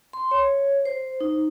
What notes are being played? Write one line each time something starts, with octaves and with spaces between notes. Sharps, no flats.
C6
C#5
C5
D#4